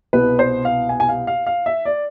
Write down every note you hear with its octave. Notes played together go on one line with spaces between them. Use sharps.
C2 B2 B3 B4
C5
F5
G#5
G#5
F5
F5
F5
E5
D5